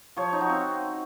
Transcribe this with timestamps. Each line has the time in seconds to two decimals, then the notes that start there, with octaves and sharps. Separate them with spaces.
0.16 F3 C#5
0.33 D#4
0.41 F#4
0.49 C4